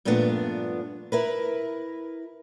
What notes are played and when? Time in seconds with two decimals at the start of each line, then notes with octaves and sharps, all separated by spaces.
0.05 G2 A#2 F3 A3 B3 D4
1.12 E4 A#4 B4